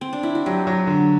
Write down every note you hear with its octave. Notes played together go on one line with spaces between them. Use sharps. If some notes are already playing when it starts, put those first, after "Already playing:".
C4
D4
E4
F#4
F#3 G4
F#3
D3